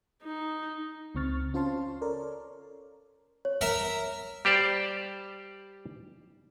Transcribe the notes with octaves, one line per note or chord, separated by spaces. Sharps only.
D#4
C#2 C#3 C4 C#6 F6 A6
C#4 F4 C5 F5 A5 C6
A4 A#4 C#5 D5
C#5
A#4 E5 A#5
G3 G4 C5 D5